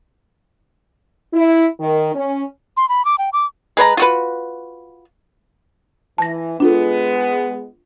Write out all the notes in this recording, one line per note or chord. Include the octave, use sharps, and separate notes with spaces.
E4
D#3
C#4
C6
B5
D6
G5
D6
G#3 B4 C#5 A#5
F4 F#4 B4
E3 A5 A#6
G#3 B3 D4 F4 A4